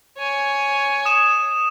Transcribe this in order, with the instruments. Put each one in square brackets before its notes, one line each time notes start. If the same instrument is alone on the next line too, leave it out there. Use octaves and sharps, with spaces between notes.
[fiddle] C#5 G#5
[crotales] D#6 E7